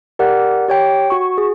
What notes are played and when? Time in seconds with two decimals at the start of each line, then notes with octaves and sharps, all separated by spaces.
0.19 G4 A#4 D5 F#5
0.68 G4 C#5 G5
1.10 F#4 C#6
1.38 G#4